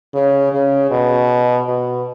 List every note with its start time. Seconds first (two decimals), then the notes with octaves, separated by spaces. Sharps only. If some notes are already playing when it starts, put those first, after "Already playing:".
0.14 C#3
0.53 C#3
0.91 B2
1.68 B2